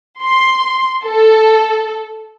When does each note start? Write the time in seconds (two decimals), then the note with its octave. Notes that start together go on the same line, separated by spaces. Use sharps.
0.21 C6
1.06 A4